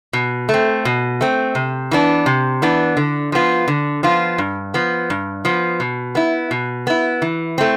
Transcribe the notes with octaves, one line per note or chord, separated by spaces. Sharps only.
B2
A3 C4
B2
A3 C4
C3
E3 B3 D4
C3
E3 B3 D4
D3
F3 B3 F4
D3
F3 B3 F4
G2
F3 B3
G2
F3 B3
B2
B3 E4
B2
B3 E4
E3
A3 C4